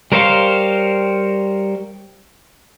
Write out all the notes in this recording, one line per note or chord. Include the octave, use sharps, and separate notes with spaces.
G3 A#4 C5 C#5 F5